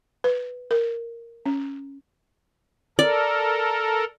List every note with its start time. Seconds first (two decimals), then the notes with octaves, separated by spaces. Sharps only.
0.24 B4
0.71 A#4
1.46 C#4
2.99 A4 A#4 D5